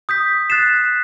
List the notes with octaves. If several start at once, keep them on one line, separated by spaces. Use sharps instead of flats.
D#6 G6 B6
F#6 A6 C7 E7